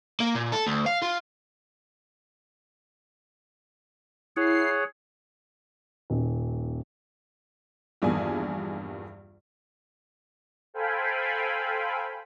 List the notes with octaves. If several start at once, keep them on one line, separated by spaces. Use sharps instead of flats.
A#3
A#2
A4
D2
F5
F4
E4 G#4 C#5 F#5 C7
D#1
A#1 E2 G2 D#3 G#4 G#5
A4 C5 F5 G5 G#5 B5